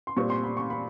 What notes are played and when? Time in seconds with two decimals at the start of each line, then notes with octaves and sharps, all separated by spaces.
0.07 C6
0.17 A#2 G3 C4 C#6
0.30 C6
0.44 B5
0.57 C#6
0.70 B5